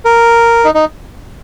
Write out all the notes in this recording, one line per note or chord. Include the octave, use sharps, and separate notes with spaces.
A#4
D#4
D#4